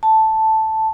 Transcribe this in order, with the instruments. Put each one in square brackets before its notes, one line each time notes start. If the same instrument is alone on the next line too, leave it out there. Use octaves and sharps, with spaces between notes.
[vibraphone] A5